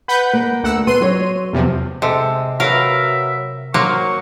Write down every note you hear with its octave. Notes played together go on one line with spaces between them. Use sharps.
B4 F#5 G6
A#3
D2 F#5 E6
B3 C6 D#7
F#3 C#5
E2 C3 F3
C3 G#3 A4
F#3 F#4 A#4 B4 E5 F5
F#3 A#3 C5 C#6